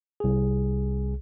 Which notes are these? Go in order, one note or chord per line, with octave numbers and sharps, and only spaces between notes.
C2 G#4